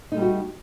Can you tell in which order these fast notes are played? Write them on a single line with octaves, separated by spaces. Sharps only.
D#4 A3 G3 E4 F#4